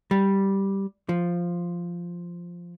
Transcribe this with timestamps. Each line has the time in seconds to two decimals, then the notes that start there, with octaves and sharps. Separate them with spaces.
0.11 G3
1.09 F3